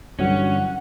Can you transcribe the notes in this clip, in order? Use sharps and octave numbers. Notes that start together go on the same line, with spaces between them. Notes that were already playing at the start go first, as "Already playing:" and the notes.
G2 D3 E3 F#3 G3 C#4 F#4 F#5